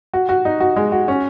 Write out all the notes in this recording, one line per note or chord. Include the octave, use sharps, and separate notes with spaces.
F#4
F#4
D#4
F#4
G#3
F#4
C#4